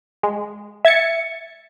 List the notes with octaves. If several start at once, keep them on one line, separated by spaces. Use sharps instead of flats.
G#3
E5 G#6 A6 C#7